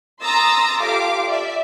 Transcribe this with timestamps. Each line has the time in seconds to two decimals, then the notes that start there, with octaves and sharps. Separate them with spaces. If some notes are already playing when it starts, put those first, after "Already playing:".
0.22 A#5 C6 D#6 E6 A6 A#6
0.80 F4 G4 A4 F5 D6
1.27 D5 E5